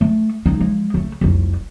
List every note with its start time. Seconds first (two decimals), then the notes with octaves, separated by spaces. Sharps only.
0.01 A3
0.46 C#2 D#4
0.60 F3 G#3
0.94 C#3 A3
1.21 F1 C2